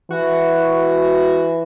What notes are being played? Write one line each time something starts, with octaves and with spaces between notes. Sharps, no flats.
E3 F#4